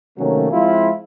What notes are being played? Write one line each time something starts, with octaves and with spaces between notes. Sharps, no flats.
C3 D#3 F#3 A3 A#3 C#4
F3 G#3 C4 E4 F4